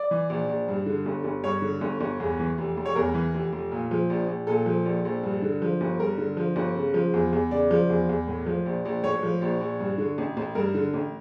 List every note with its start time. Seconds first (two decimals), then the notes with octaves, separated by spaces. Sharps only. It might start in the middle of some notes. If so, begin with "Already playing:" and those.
Already playing: D5
0.11 E3
0.29 A#1
0.49 A#1
0.68 G2
0.86 D3
1.06 G1
1.24 G1
1.43 G2 C#5
1.62 D3
1.81 G1
2.01 G1
2.20 E2
2.39 E3
2.58 F1
2.77 F1
2.85 C#5
2.96 E2 A#4
3.14 E3
3.34 F1
3.53 F1
3.72 A#2
3.91 F3
4.10 A#1
4.28 A#1
4.47 A#2 A4
4.66 F3
4.85 A#1
5.05 A#1
5.23 G2
5.42 D3
5.62 F3
5.81 G1
5.99 G2 A#4
6.18 D3
6.37 F3
6.56 G1
6.76 C#3
6.94 F3
7.14 E2
7.33 E2
7.51 C#3 D5
7.71 F3
7.90 E2
8.09 E2
8.28 A2
8.46 F3
8.66 A#1
8.85 A#1
9.03 A2 C#5
9.23 F3
9.41 A#1
9.60 A#1
9.80 G2
9.98 D3
10.18 A1
10.37 A1
10.55 G2 A#4
10.75 D3
10.94 A1